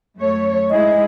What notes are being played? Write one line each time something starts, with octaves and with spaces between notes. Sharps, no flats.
F#2 A3 C#5
G#2 E4 G#4 D#5